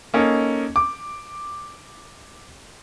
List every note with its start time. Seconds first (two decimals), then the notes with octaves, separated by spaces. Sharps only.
0.14 A#3 C#4 D#4 A4
0.76 D6